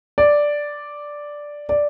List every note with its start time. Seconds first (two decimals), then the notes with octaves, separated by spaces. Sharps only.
0.18 D5
1.69 D5